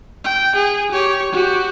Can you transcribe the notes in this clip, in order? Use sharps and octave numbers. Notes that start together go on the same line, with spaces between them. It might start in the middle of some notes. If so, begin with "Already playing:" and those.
G5
G#4
G4 C#5
F#4 G4